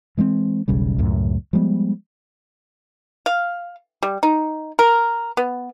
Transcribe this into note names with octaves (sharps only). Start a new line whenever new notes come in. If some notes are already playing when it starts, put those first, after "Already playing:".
E3 G#3 A3 C4
E1 B1 C#3 G3
C#2 F#2 A2
F3 G3 G#3 B3
F5
G3
D#4
A#4
B3